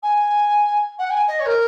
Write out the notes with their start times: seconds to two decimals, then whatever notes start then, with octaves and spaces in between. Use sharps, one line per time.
0.03 G#5
0.98 F#5
1.10 G#5
1.27 D#5
1.39 C#5
1.46 A#4